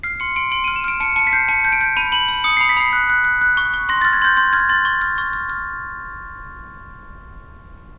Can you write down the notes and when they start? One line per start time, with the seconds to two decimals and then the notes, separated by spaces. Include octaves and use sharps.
0.03 F6 C7
0.20 C6 C#7
0.36 C6 D7
0.51 C6 D7
0.64 F6 D#7
0.76 E7
0.84 F6 D7
1.00 A5 C#7
1.16 A5 C#7
1.27 B6
1.33 G6 C7
1.49 A5 C#7
1.65 G6
1.72 D7
1.81 G6
1.97 B5 D#7
2.12 B5 F#7
2.28 B5
2.44 D#6 C#7
2.57 B5 C7
2.69 B6
2.77 B5 C7
2.93 F#6
3.09 F#6
3.25 F#6
3.41 F#6
3.57 C#6
3.74 C#6
3.89 C6 A#6
4.01 F6 A6
4.13 G#6
4.22 C6 G6
4.37 C6 G6
4.53 F6 G#6
4.69 C6 A6
4.85 C#6
5.02 F6
5.18 C#6
5.33 F6
5.50 F6